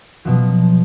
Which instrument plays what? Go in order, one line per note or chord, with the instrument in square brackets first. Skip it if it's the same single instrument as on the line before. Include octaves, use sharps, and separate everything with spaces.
[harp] B2 F3 F#3